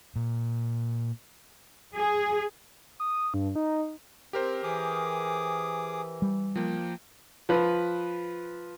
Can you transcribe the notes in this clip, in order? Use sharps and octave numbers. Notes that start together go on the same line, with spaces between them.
A#2
G#4
D#6
G2
D#4
C4 G4 A#4 C5
E3 G#4 D6 D#6
G3
F3 A#3 G5
F3 B4